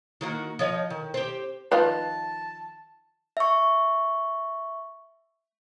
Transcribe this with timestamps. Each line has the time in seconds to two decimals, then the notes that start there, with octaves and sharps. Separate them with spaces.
0.21 D#3 A#3 F#4
0.59 F3 C#5 D#5
0.90 D#3
1.14 C4 G4
1.72 D#3 F3 F4 B4 A5
3.37 E5 C#6